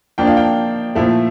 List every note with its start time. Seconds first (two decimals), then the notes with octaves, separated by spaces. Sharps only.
0.18 F3 A#3 D4 G5
0.27 F5
0.37 G5
0.95 A#2 F3 A3 E4